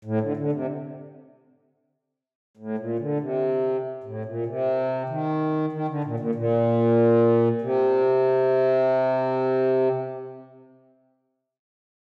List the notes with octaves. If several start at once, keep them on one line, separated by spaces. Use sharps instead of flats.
A2
D3
D3
C3
A2
A#2
D3
C3
A2
A#2
C3
D#3
D#3
D3
A#2
A#2
A#2
C3